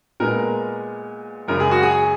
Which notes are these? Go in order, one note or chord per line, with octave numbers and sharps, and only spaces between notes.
A#2 G#3 B3 A#4
F#2 C#3 G#3 A#4
G#4
F#4
G#4